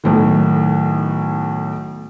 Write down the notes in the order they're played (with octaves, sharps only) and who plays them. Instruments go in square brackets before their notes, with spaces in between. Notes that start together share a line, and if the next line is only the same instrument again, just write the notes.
[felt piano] B1 A2 D#3